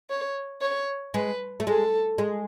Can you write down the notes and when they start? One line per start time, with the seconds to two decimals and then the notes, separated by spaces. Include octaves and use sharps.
0.10 C#5
0.61 C#5
1.14 G#3 B4
1.60 A3
1.67 G#3 A4
2.18 G#3